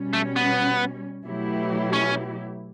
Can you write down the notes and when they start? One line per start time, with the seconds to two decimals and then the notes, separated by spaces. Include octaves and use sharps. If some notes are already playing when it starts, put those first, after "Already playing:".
Already playing: B2 G3 C#4
0.13 A3
0.36 B3
1.26 B2 F#3 A3 E4 G4
1.93 C#4